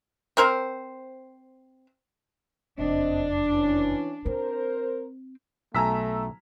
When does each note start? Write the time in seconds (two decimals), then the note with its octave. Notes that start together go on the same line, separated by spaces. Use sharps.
0.37 C4 A#4 C5
2.78 F#1 F2 C4 D4 D#5
3.52 E3 C#4
4.26 C4 A#4 C5
5.75 B1 A3 G#5 A#5 E6 B6